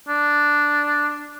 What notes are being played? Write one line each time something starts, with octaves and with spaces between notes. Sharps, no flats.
D4